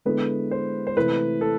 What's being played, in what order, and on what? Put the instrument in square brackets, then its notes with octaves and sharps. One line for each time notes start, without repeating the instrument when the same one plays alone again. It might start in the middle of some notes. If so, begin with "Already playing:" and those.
[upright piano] D3 G#3 B3 E4 A4 [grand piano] B4
[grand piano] C5
C5
[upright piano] C3 E3 A3 E4 [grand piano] B4
[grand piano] A4